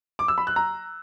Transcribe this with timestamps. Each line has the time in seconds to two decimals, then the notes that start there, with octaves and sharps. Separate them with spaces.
0.19 D6
0.28 E6
0.38 B5
0.47 F#6
0.56 A#5